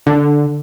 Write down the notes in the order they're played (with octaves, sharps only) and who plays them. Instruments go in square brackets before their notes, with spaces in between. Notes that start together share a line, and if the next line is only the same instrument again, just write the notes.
[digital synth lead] D3